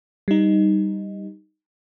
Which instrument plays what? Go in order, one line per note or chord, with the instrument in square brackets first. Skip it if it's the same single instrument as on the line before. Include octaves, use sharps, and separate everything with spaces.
[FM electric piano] G3 D#4